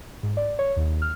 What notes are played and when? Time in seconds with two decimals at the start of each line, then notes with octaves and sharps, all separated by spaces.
0.23 G#2
0.37 D5
0.59 C#5
0.77 D#2
1.02 F6